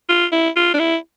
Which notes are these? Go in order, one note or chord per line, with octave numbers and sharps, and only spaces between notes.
F4
E4
F4
D4
E4